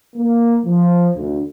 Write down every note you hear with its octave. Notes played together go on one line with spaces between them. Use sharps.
A#3
F3
D2